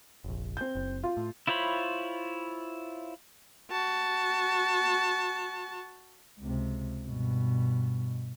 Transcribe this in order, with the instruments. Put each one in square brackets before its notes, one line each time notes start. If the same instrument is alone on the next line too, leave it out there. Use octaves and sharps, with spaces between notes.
[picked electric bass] F1 A#1
[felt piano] C4 G6
[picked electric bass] F#1
[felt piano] F4
[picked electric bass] A2
[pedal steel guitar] E4 F4 C5 C#5 B5
[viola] F#4 A5
[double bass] C#2 C3
G2 B2